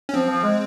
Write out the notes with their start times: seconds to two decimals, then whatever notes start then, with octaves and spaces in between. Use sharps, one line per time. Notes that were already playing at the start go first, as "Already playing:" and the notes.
0.09 C#4
0.14 F3 C4
0.28 F3
0.43 G#3